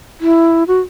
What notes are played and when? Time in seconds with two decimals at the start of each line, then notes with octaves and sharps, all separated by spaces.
0.21 E4
0.68 F#4